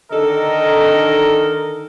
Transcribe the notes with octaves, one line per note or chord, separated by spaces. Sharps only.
D3 D#3 D#4 A4 A#4 D#5